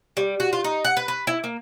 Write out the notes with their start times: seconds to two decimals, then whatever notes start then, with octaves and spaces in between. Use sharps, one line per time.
0.17 G3
0.40 F#4
0.53 F4
0.64 D#4
0.85 F#5
0.97 B4
1.08 B4
1.27 E4
1.44 A#3